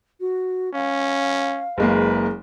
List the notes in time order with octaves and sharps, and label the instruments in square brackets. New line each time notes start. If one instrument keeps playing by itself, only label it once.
[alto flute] F#4
[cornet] C#4 [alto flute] F5
[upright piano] F#1 G#3 A#3 [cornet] B4